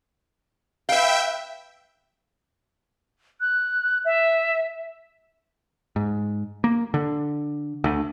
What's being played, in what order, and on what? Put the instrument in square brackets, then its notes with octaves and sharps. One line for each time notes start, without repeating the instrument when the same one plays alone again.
[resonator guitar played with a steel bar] B4 F5 [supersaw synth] E5 G5
[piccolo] F#6
E5
[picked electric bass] G#2
A#3
D3
D2